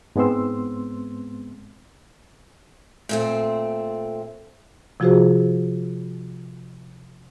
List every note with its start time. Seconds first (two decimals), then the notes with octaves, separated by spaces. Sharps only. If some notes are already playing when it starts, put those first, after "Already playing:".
0.16 G#2 G#3 B3 C4 C6 E6
3.09 A#2 A3 C4
5.00 C3 F3 F4 F#4 G#4 C5